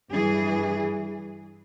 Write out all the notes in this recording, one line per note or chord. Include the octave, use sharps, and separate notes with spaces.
G2 E3 G#4